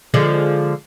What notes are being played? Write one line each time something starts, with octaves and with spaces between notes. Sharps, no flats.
D3 F3 G#3